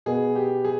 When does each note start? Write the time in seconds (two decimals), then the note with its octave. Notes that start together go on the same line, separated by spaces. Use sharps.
0.06 B2 B3 G#4
0.35 G4
0.65 G#4